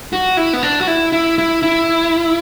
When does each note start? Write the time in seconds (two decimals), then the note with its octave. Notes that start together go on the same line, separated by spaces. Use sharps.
0.13 F#4
0.37 E4
0.53 B3
0.63 D4
0.81 F#4
0.87 E4
1.12 E4
1.38 E4
1.63 E4